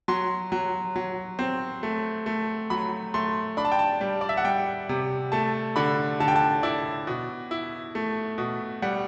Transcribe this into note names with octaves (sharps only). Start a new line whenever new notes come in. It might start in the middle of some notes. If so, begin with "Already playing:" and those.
F#3 C6
F#3
F#3
C4
A3
A3
F#3 B5
A3 C6
D4 B5
A5
G5
A5
G3
D5
E5
F#5
G3 G5
C3
A3 A5
D3 B5
D3 A5
G5
A5
E4 D5
B2
E4
A3
B2
G3 F#5